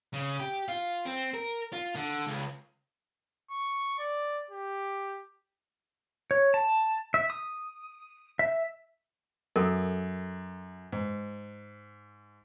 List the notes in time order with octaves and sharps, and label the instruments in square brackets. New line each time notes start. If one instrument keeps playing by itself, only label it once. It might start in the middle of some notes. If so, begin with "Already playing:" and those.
[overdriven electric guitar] C#3
G4
F4
C4
A#4
F4
D3
C#2
[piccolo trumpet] C#6
D5
G4
[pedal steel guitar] C#5
A5
E5
D#6
E5
[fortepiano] F#2 [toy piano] A4 A#4
[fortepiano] G#2